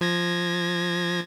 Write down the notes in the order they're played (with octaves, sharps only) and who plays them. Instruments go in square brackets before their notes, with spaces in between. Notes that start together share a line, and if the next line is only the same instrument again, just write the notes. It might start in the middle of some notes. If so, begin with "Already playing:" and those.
[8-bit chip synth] F3 G#6 A#6